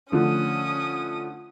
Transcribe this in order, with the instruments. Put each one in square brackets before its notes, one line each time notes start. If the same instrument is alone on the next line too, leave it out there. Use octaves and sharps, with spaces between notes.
[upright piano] D3 F3 A3 [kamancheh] C#4 D#6